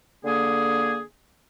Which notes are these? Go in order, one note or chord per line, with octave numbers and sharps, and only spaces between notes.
D3 A#3 G#4